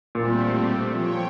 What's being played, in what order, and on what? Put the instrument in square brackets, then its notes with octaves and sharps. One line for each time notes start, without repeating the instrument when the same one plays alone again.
[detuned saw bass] E1 [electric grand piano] A#2 [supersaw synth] G3 A3 C4
[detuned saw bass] F3 [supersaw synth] C#5 G5